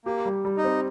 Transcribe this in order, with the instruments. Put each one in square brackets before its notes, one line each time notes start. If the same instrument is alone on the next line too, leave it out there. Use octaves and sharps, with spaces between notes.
[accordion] A#3 [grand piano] G4
[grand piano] G3
G3
[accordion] D#4
[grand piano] C4